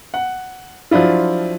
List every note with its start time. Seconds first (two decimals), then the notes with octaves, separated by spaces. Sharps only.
0.14 F#5
0.91 F3 F#3 D4 E4 F4